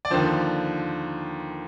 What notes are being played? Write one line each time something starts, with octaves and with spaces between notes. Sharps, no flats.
D5
D#2 D3 F3 C5